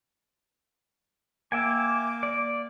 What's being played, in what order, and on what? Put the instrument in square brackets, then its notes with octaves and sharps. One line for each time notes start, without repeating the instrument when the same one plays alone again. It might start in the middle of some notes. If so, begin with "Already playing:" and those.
[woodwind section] A#3 D6 [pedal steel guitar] E5 G5 G#5
[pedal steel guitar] D5